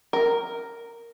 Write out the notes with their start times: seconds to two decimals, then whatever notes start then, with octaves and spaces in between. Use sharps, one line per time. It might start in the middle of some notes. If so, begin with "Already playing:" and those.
0.13 A#4